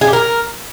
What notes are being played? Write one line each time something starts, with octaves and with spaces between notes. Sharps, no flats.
G#4
G4
A#4